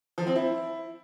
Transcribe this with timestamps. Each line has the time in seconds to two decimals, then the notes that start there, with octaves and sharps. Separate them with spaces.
0.18 F3
0.27 C4
0.36 E4